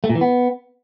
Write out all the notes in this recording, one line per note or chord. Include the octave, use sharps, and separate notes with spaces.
A3
A#2
E3
B3